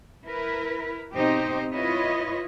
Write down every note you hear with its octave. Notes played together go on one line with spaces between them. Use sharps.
E4 A#4 B4
B2 C4 D#4 G4 C5 D#5
E4 F4 B4 C#5 D#5